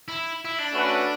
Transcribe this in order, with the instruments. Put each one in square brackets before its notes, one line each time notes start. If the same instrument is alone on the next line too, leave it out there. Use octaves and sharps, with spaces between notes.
[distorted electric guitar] E4
E4
D4
[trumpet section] A3 C#4 F#4 B4 F#5